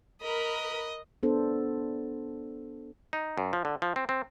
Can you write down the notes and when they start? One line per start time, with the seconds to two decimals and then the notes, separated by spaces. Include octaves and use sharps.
0.21 A#4 B4 D#5 B5
1.23 B3 D4 A4 C5
3.13 D#4
3.38 F#2
3.53 F3
3.65 D3
3.82 F3
3.96 C4
4.09 C4